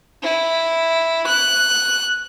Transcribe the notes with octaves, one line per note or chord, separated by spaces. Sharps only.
E4
F#6